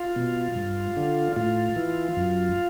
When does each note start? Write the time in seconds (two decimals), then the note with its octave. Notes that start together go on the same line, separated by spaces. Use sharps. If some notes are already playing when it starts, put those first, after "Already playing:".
Already playing: F4
0.16 B2
0.56 G2
0.97 D3
1.36 A2 F4
1.76 E3
2.17 F#2